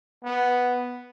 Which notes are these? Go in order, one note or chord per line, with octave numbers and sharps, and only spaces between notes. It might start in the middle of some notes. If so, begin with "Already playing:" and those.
B3